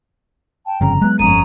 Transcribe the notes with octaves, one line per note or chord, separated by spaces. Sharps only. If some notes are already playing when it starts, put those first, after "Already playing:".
G5 A5
G1 F2 C#3 A#5
F#3 G#3 B3 F#6
G1 F2 C#4 A#5 D#6 D#7